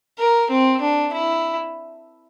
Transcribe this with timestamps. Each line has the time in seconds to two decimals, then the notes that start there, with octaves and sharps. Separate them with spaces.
0.19 A#4
0.51 C4
0.81 D4
1.13 E4